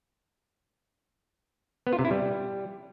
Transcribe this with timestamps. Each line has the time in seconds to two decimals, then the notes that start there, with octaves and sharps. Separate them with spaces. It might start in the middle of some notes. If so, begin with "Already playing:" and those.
1.87 B3
1.93 F4
1.99 C3
2.05 E4
2.11 G3